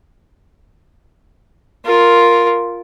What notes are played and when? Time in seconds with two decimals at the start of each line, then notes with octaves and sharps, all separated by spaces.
1.85 F4 A#4